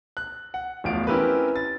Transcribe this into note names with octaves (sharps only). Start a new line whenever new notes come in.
F#6
F#5
D1 A1 E2 F3 F5 D7
C4 C#4 E4 G4 A#4 B4
A6